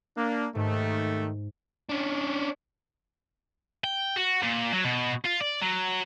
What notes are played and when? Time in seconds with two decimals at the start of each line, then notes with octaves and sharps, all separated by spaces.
0.16 A#3 D4
0.55 D#2 G#2 D#3 A3
1.89 C#4 D4
3.84 G5
4.16 F#4
4.43 A#2
4.73 F#3
4.85 B2
5.25 F4
5.40 D5
5.62 F#3